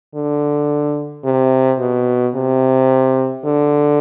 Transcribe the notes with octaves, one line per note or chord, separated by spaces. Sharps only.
D3
C3
B2
C3
D3